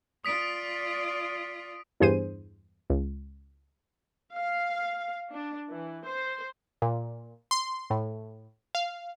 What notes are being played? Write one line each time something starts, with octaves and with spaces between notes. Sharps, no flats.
F4 D5 D#6 B6 D7
E2 G2 G#4 C5 D#7
C#2
F5
D4
E3
C5
A#2
C6
A2
F5